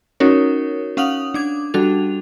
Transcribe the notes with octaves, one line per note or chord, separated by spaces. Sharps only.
C#4 D#4 F#4 A#4 C#5
C#4 F5 F#5 D#6 F7 F#7
D4 D6 G#6
G3 D4 F#4 A4 F7